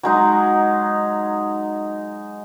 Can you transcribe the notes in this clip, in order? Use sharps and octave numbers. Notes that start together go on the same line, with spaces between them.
F#3 G#3 D#4